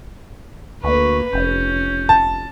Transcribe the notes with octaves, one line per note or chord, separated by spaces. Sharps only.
D2 A#3 B4 C#6
F1 C#4 G6
A5